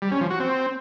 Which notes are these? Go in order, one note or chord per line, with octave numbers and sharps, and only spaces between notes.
G3
C#4
F3
F#4
C4